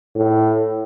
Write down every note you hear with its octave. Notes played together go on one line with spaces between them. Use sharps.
A2